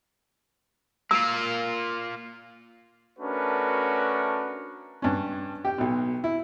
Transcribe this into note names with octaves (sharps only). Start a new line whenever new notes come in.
A#3 F4 E6
A3 C#4 D4 F#4 A#4 B4
G2 C#4
G4 G5
B1 B2
E4